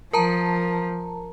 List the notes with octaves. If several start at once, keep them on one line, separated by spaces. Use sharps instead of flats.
F3 A#4 A5 A#5